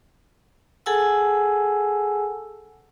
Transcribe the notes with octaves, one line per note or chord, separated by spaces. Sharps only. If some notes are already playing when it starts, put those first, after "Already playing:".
G#4 A4 F#5 G#5 A5 E6